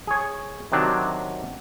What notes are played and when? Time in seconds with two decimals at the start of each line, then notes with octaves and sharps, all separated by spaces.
0.07 G#4 C#5
0.72 C3 D#3 F#3 D4